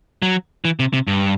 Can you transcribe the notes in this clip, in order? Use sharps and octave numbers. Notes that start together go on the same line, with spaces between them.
F#3
E3
C3
C3
G2